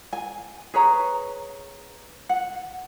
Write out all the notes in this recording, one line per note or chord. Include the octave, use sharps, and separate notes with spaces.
G#5
G#4 B4 C#5 A#5
F#5